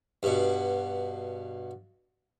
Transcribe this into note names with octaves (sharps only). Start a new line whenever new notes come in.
G2 B2